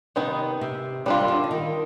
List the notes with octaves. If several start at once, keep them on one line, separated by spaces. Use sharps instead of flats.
C3 D#3 B3 D#4
C3
C3 G3 D4 F4
D#3
D3
D3
D#3